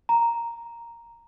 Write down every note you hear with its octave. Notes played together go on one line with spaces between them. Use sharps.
A#5